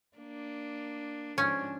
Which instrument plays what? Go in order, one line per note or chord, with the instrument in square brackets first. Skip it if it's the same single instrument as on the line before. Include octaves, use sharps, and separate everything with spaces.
[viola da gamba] A#3 D4
[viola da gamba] G#2 F3 D4 [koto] C#4